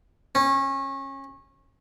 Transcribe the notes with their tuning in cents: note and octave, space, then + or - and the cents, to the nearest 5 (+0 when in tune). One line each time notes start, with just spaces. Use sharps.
C#4 -25